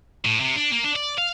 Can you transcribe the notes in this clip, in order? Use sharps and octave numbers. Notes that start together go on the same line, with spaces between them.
A2
C3
D4
A#3
D4
D5
F5